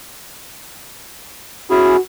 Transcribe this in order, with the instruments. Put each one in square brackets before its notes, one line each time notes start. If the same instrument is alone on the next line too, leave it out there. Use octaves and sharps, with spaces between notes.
[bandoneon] C#4 E4 G#4 [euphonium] F#4